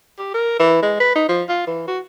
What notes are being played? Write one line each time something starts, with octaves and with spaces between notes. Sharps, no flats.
G4
A#4
E3
G#3
B4
D#4
F3
F4
E3
F#4